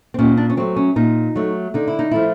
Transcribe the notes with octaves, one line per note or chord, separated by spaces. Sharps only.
C4
A#2 C#4
D4
C#4
F#3 A3 C4
C#4
A#2 D#4
F#3 A3
D3 D#4
E4
D#4
F3 A3 E4